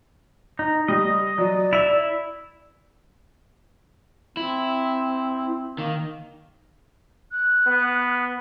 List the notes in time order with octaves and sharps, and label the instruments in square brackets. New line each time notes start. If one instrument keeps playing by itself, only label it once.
[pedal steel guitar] D#4
[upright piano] G3 [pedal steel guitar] D#5
[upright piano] F#3 [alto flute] D5
[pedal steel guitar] E4 E5 [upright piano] F7
[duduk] C4 [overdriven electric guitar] E4
[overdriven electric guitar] D#3 [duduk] A#3
[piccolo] F#6
[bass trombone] B3